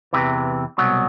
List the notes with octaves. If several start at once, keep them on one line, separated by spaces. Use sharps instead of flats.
E2 C3 E3
C2 B2 F#3